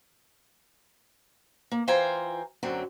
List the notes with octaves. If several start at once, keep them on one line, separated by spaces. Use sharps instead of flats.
A#3
E3 F4 C5 G5 G#5 A#5
F#2 D3 F#3 C4